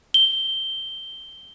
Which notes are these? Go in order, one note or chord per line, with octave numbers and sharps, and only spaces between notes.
G7